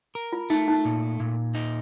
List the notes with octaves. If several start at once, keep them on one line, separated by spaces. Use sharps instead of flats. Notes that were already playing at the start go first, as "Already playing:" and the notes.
A#4
F4
A3 D#4
D#4
A#2
A#2
D#4